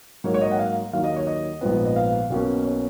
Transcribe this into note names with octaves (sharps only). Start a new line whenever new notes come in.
G#2 F#3 A#3 C#5
C#5
D#5
F#5
F5
D#2 D#3 F#3 F5
D#5
C#5
D#5
A#1 G#2 F3 B3
D#5
F5
B1 B2 A#3 C#4
C#5